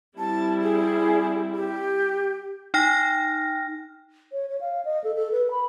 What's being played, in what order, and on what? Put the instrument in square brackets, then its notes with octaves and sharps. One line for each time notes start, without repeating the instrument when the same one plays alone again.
[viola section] G3 C4 E4 [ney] A5
[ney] G#4
G4
[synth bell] D#4 G5 F6 A#6
[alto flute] C#5
C#5
F5
D#5
A4
A4
B4
B5